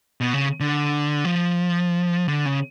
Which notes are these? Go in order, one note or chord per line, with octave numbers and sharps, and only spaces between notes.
B2
C#3
D3
F3
D3
C#3